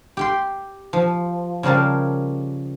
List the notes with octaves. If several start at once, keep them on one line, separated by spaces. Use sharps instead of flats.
G4 G5 C6
F3
C#3 F3 G3 A#4 A5